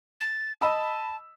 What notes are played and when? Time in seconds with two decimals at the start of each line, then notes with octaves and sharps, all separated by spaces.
0.21 A6
0.61 D#5 A5 B5 E6